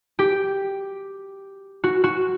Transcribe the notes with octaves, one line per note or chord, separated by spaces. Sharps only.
G4
F#4
F#4